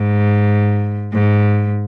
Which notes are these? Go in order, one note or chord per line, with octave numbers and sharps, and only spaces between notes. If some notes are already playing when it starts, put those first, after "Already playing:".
Already playing: G#2
G#2